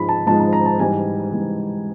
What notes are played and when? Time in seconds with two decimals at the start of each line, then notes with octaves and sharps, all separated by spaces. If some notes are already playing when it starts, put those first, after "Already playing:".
Already playing: G#2 F3 G#3 B5
0.09 A5
0.27 G#2 F3 G#3 A5
0.40 A5
0.53 A#5
0.66 A5
0.79 G#2 E3 G3 G#5
1.32 G#2 E3 G3